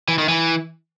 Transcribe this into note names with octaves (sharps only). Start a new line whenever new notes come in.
E3
D#3
E3